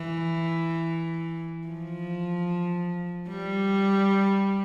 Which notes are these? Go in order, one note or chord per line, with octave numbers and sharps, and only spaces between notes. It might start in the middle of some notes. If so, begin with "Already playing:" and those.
Already playing: E3
F3
G3